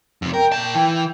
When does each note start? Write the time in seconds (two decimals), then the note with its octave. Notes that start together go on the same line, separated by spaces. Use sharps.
0.22 F2 C3
0.34 A#4 G5
0.52 A#2 A5
0.74 E3